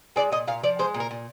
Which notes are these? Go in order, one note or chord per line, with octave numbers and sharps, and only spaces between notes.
G#3 D5
A#2 D#5
A#2 F5
F3 D5
G#3 C5
A#2
A#4
A#2